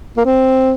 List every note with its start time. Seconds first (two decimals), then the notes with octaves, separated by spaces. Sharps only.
0.17 A#3
0.25 C4